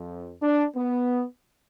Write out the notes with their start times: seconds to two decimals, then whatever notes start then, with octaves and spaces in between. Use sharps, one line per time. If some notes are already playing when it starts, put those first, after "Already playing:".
Already playing: F2 F3
0.41 D4
0.75 B3